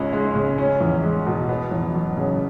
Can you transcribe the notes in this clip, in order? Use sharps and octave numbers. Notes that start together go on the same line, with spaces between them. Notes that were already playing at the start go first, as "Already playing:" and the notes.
Already playing: C#2 C#4
G#3
C#3
C#4
E2
G#3
B2
B3
E2
F#3
C#3